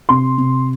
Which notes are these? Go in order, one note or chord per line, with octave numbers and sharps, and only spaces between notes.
C3 C6
C3